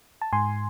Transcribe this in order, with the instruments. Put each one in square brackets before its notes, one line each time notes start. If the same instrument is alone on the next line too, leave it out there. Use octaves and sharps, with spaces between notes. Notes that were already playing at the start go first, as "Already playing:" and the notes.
[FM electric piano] A5
G#2 G#5 C6